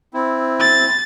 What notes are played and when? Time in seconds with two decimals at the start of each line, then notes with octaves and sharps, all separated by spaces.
0.14 C4 E4
0.61 A6